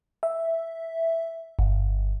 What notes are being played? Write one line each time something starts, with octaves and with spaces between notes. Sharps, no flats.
E5
G1